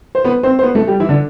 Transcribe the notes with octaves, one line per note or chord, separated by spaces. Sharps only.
C5
B3 B4
C4 C5
C5
B3 B4
A3 A4
G3 G4
E3 E4
D3 D4